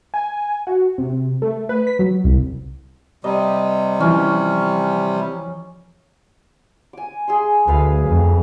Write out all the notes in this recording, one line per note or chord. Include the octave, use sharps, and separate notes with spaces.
G#5
F#4
C3
A3
B4
B6
F#3
C2
C3 G3 D#5
E3 F3 C#4
G#5 D6
G#4 E5 C6
D2 B4 E5 F5
F2